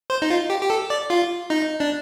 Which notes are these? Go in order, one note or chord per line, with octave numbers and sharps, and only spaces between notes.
C5
D#4
F4
G4
G4
A4
D5
F4
D#4
D4